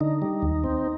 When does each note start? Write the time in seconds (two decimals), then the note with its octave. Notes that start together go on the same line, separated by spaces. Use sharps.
0.01 D3 D#4
0.22 G3
0.42 D#2
0.64 C4